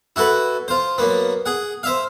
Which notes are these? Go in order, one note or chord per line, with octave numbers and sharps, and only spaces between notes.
E4 F#4 A4 B4
F4 C5
F#2 A#3 B3
G#4 F#5
C5 E5 F5